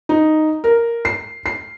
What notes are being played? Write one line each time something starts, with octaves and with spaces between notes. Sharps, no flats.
D#4
A#4
C7
C7